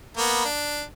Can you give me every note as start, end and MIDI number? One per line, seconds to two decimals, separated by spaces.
0.17 0.44 58
0.17 0.44 59
0.45 0.83 62